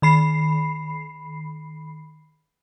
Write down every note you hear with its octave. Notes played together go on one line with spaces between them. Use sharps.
D#3 B5 C7